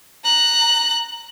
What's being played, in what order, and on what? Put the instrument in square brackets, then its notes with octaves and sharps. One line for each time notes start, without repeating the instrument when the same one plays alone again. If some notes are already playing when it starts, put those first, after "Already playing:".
[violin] A#5 F#6